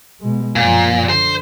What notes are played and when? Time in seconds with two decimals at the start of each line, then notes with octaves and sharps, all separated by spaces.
0.20 B2 G#3
0.56 F#2 A#2 F3
1.09 D3 C5